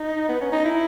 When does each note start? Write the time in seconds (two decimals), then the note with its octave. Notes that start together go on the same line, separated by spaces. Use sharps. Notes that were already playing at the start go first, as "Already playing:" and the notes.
Already playing: D#4
0.29 B3
0.41 C#4
0.52 D#4
0.65 E4